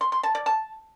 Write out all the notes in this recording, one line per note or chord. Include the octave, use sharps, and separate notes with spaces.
C6
C6
A5
D5
A5